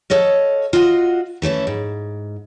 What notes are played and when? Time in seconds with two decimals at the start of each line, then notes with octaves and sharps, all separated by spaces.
0.10 A4 C#5 D#5 F5
0.73 F4 F#4 D#5 F#5
1.42 E3 A3 C#4 E4
1.67 G#2